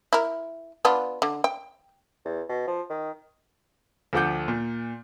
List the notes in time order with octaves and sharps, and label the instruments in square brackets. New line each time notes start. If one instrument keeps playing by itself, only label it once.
[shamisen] E4 A#4
B3 D4 F4
D3
G5
[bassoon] E2
B2
F3
D#3
[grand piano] D2 F3 A4 F#5 D6 G6
A#2